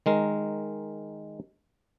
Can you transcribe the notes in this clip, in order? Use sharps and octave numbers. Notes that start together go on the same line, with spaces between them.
D#3 G#3 A#4